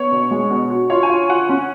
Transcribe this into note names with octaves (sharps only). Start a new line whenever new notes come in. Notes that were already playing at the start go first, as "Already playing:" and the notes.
Already playing: B3 C#5
B2
G#3
B2
F#4
F4 C#5
G#5
F4
F4 F#5
C#4